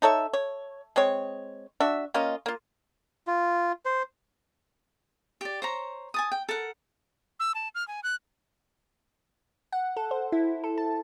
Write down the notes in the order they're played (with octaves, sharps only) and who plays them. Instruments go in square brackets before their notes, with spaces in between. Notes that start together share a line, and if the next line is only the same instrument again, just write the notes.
[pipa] D#4 A4 C#5 E5
C#5
G#3 C4 C#5
D4 F#4 E5
A#3 C#4 F4 D#5
A#3 F4
[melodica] F4
C5
[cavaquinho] G4 D5
C5 C#5 A#5
G#5 A5 D#6
G5
A4 A#4 F#5
[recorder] E6
A5
F6
G#5
F#6
[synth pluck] F#5
A4
C5
E4
A4
A5